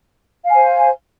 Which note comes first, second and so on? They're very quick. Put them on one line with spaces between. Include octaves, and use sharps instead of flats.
F5 G#5 C5